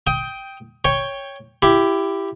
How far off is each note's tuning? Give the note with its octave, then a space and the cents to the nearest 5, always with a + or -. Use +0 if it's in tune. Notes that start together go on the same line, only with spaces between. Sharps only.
G5 +0 D#6 +25
C#5 +0 G5 +15
E4 +20 G4 +0